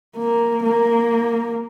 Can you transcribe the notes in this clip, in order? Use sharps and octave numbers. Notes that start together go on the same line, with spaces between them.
A#3
A#3